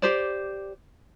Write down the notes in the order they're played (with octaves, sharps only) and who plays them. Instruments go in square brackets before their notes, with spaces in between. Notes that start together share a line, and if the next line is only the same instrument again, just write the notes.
[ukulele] G4 C5 D5